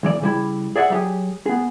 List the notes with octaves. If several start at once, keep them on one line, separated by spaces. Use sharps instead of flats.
B1 E3 D5
C#3 G3 E4
G#4 D5 E5 F#5
F#3 G4 G#4
B3 G#4